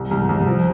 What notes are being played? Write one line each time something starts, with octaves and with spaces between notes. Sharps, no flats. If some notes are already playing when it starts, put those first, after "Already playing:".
Already playing: C2
C2
C2
F3